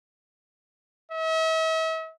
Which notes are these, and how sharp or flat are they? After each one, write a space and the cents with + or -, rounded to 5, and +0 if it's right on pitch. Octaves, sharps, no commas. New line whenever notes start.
E5 -40